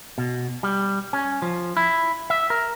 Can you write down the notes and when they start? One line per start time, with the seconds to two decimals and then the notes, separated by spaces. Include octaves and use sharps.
0.18 B2
0.63 G3
1.13 C#4
1.42 F3
1.77 E4
2.30 E5
2.50 A#4